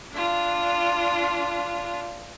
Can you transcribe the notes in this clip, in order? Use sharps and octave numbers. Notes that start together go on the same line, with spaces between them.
D4 F4